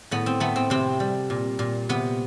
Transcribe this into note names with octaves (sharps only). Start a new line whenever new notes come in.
A2 B3
C4
A3 B3
C4
C3 C4
G3
A#2
A#2
C3 B3